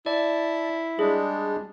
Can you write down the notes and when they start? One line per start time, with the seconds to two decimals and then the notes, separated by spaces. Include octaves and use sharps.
0.06 E4 D5 A5
0.99 G3 G#3 D4 G#4